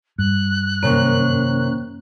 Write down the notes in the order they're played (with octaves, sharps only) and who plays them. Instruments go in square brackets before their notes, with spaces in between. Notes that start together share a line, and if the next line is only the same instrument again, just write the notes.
[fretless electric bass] G2 [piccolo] F#6
[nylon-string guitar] F#2 C3 D#3 [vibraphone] A#3 C#4